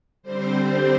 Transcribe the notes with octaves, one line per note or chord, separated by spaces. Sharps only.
D3 G3 C4 C5
C5